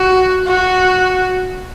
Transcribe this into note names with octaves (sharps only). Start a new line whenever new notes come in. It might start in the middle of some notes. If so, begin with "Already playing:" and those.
Already playing: F#4
F#4